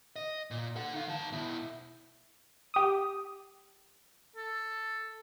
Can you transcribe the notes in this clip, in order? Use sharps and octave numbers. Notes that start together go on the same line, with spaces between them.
D#5
A#2
A4 F#5
D#4 F5
D#3 A5
B2 E4
G4 D#6
A4